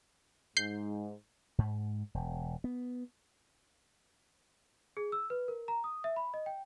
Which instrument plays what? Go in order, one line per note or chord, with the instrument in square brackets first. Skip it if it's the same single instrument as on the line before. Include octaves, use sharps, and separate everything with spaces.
[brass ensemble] G#2 [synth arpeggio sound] G6 C7
[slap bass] G#2
E1
B3
[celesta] G#4
E6
B4
A#4
A#5
D#6
E5
B5
D#5
G5